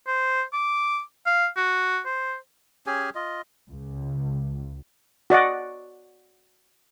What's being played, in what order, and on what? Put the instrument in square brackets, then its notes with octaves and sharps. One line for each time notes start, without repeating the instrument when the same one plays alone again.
[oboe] C5
D6
F5
F#4
C5
[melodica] C#4 G4 G#4 G#5
F4 D#5
[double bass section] C#2
[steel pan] F#4 D5 D#5 F#5